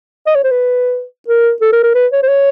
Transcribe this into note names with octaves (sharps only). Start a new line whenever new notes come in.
D#5
C#5
C5
B4
A#4
A4
A#4
A#4
B4
C#5
C5
C#5